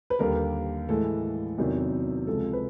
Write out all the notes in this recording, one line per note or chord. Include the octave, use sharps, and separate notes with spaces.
B4
D#2 D3 G3 A#4
A2 E3 G#3 A4
E2 C3 D#3 F#3
C#2 C3 F3 G#3 A4
B4